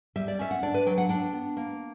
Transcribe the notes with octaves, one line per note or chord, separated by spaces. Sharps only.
G3 E5
D5
C#4 E5
F#5
D4 D5
B4
F#3 G5
F#5
D4 G5
B3
A#3